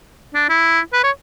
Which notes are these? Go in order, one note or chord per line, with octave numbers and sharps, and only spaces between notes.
D4
E4
B4
C#5